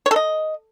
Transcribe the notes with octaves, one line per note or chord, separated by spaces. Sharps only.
C#5
A4
D#5